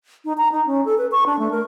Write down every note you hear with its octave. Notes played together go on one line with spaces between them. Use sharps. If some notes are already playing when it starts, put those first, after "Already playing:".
D#4
A#5
D#4
C#4
A4
B4
C#6
D4
A3
A#4